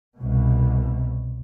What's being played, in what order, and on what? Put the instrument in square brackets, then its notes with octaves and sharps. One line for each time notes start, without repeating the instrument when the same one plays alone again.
[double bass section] C2 B2